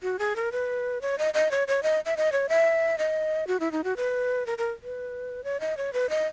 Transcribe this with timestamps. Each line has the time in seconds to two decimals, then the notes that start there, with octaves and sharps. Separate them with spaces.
0.03 F#4
0.19 G#4
0.36 A#4
0.52 B4
1.02 C#5
1.18 D#5
1.34 D#5
1.51 C#5
1.68 C#5
1.83 D#5
2.06 E5
2.17 D#5
2.32 C#5
2.49 E5
2.98 D#5
3.47 F#4
3.60 E4
3.72 D#4
3.84 F#4
3.97 B4
4.46 A#4
4.58 A#4
4.83 B4
5.44 C#5
5.60 D#5
5.77 C#5
5.93 B4
6.10 D#5